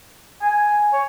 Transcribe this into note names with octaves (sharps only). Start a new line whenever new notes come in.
G#5
C#5